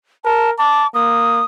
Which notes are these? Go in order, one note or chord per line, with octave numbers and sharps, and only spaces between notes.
A#4 A5
A5 D6
A#3 D#6